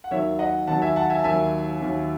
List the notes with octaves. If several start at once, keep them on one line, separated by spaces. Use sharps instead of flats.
F#5
D#2 D#3 F#3 C#5 E5
D#5 F#5
D#2 D#3 F#3 F#5 A5
E5 G#5
F#5 A5
E5 G#5
A5
D#2 D#3 F#3 E5 G#5
D#2 D#3 F#3